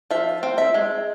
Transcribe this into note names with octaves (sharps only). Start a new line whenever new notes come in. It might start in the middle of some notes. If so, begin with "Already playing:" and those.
F3 E5
C4
E5
G#3